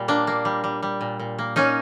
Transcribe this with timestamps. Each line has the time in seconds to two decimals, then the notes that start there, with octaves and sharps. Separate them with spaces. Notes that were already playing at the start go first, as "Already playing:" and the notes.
Already playing: A#2 G3
0.08 A#3 D4
0.27 A#3
0.45 G3
0.64 G3
0.82 G3
1.01 A#2
1.20 A#2
1.39 A#3
1.56 A#3 C#4 D#4